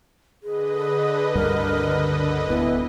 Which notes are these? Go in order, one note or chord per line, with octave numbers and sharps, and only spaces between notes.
D3 G#4 B4 D#5
C#2 G2 G3 A#4
D1 B3 E4